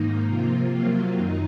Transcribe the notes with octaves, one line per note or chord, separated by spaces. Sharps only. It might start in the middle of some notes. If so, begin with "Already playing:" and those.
Already playing: G#2 D#3 A#3 D#4
C3 F3 A#3 F4
C3 F#3 A#3
F#2 D#3 D#4